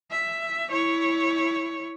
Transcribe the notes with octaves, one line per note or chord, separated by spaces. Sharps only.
E5
E4 C#5